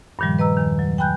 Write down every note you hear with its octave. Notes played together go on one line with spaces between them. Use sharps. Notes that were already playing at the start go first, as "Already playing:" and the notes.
G2 A#2 D#3 F3 G3
B4 D#5 A#5 E6
E2 D#3
F#3
G5 G#5 B5 F#6 G6